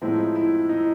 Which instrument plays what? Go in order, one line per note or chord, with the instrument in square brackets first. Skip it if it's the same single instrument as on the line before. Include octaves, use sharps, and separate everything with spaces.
[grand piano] A2 F3 G#3 C4 D#4 E4
E4
D#4
E4